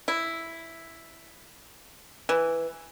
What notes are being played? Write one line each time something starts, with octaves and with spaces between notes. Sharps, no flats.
E4
E3